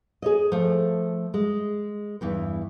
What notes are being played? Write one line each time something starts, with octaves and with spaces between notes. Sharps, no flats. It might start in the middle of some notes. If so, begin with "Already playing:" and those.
G#4 C#5 D#5
F3 A3
G#3
E2 G2 E3